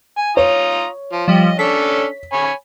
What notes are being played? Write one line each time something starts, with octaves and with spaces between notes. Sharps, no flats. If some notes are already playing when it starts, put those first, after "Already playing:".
G#5
F4 C#5 A#5 D#6
F3
F3 G3 D#5
C#4 D4 A4 B6
C#5 G#5 B5